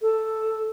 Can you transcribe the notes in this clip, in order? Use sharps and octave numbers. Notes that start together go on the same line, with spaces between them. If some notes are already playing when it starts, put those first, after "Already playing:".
A4